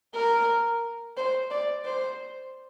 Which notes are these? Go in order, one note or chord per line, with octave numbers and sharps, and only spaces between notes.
A#4
C5
D5
C5